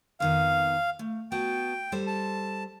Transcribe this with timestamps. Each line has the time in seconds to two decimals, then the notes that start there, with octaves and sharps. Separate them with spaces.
0.20 F2 D#3 B3 F5
0.99 A3
1.32 B3 F#4 G5 A5
1.92 G3 A4 C5
2.07 A5